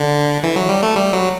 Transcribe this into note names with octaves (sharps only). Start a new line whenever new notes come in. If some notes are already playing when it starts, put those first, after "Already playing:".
Already playing: D3
E3
F#3
G3
A3
G3
F#3